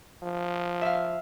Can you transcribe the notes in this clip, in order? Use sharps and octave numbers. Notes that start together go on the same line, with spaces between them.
F3
E5 F5